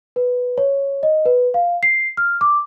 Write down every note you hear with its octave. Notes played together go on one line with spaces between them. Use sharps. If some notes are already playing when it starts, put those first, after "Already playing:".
B4
C#5
D#5
B4
F5
C7
F6
D6